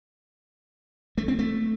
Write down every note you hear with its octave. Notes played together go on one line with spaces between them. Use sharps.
A3
C4
A3